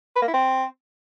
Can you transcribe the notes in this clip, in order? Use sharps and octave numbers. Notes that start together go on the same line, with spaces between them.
B4
A#3
E4
C4